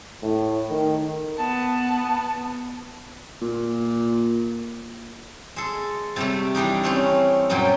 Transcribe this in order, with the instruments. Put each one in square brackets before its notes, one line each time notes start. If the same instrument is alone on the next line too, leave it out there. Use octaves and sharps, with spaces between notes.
[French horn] A2
D#3
[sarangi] B3 [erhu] A5
[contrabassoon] A#2
[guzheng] G#3 A4
C3 G3 A3
E3 G3 D4 D#4
A3 C4 C#4
F#2 A#2 F#3 G3 G5